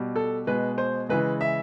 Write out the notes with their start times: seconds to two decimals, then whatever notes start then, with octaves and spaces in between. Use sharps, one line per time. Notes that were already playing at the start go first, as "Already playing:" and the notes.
Already playing: B2 G3
0.16 A4
0.47 B2 G#3 B4
0.78 C5
1.09 C#3 E3 G#3 B4
1.41 E5